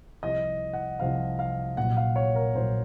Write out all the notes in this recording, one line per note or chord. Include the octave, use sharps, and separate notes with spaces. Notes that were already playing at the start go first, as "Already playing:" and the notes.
C2 C3 F3 D#5
F#5
C2 C3 F3 F5
F5
A#1 A#2 F#3 F#5
F5
C#5
A#4
A#1 A#2 F#3 C5